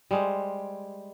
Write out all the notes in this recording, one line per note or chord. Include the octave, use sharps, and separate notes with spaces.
G3 G#3 C5